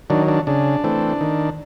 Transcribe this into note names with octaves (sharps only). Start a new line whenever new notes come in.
D#3 F#3 D4
D4
C#3 D4
E3 A3 C4
D#3